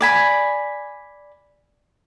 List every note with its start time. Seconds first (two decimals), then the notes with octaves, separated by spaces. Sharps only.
0.01 D5 G#5 B5